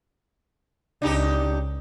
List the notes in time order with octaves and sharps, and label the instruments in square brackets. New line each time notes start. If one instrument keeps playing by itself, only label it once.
[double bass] C#2 [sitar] D4 D#4 G4